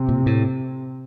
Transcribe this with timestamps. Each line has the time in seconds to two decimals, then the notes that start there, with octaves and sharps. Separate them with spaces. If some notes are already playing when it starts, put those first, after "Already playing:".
Already playing: C3
0.09 A#2
0.26 A2